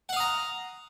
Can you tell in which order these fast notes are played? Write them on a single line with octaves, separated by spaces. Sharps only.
F#5 F5 D#6 A#5